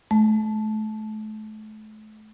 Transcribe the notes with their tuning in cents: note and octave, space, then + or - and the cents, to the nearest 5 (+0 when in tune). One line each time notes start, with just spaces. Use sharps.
A3 -35